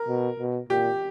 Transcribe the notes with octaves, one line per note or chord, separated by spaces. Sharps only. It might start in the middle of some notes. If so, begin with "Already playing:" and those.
Already playing: A#4
B2
B2
A#2 G4